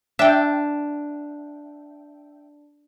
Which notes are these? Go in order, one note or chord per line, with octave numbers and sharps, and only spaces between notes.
D4 E5 G5